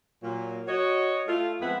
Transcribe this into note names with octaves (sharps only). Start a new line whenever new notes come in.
A#2 F#3 A#3
F#4 C#5 D#5
A3 F4
F2 G#3 B3 B4 E5 F#5